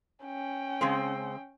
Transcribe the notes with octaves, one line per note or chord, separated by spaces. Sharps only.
C#4 G5
C#3 G#3 C4